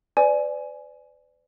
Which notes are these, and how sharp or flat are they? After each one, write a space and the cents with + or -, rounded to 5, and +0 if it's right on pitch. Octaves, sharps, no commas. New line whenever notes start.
B4 +40 D5 +0 G#5 +15